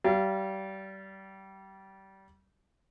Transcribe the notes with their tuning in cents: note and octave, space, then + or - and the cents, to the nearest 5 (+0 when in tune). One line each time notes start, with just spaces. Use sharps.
G3 -25 F5 -35